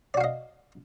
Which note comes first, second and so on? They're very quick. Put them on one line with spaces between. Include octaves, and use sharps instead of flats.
D5 F#4 F5 D#5